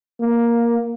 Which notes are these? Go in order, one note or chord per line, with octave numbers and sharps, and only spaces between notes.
A#3